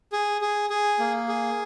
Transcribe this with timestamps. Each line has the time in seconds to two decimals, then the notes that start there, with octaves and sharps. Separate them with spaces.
0.12 G#4
0.41 G#4
0.70 G#4
0.99 A#3
1.28 G#4